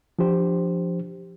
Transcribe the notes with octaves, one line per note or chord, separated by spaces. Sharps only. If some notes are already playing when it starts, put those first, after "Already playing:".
F3 D4 G4 C5